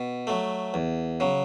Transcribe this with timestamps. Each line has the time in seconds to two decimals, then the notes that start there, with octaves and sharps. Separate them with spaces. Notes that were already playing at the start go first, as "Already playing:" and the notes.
Already playing: B2
0.27 F#3 A3
0.74 E2
1.20 C#3 F#3